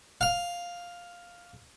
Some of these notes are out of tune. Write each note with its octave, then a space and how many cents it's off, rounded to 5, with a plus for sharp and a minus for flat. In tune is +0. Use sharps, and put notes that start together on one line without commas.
F5 +5